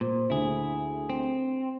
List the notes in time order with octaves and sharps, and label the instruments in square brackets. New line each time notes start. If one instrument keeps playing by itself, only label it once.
[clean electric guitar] A#2 [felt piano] C5
[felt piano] D2 [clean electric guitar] E4 G#4
[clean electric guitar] C4